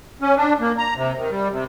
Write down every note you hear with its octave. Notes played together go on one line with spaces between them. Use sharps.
C#4
D4
A#3
A#5
C3
D#3
G3
C3